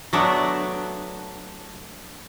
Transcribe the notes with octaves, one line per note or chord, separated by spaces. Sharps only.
F#3 A3 B3 D4